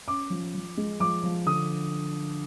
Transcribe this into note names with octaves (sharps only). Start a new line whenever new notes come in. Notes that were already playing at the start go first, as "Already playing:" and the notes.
C#4 D6
F3
F3
G#3
F3 D6
F3
D3 D#6